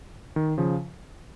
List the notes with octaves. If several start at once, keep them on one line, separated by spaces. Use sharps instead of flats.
D#3
C#3 F3